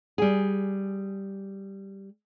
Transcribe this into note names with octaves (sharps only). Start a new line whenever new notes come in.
G3 G#4